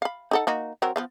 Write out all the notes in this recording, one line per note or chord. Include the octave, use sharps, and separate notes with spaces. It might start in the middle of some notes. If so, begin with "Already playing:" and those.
F5 B5
D#4 A4 F#5
A#3 D#4 F#4
F#3 C4 A#4
F3 B3 F5